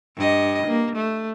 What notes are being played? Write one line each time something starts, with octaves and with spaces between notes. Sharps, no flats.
G2 D#5
A#3
A3